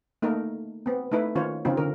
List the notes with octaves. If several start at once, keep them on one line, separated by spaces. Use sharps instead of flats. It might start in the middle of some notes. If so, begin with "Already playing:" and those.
A3 A#3 D#4 A#4
B3 C4
A3 D#4 E4 B4
D#3 C#4 F4 C5 C#5
C#3 F3 C4 D#4 F4
D3 A#4